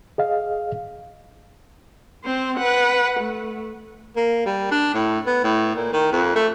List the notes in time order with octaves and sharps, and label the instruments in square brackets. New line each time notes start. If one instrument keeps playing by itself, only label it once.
[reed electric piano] G#4 D#5 F5
[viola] C4 C5
B4 F#5
A3
[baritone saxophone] A#3
G3
D4
A2
B3
A2
A#2
D#3
F2
A3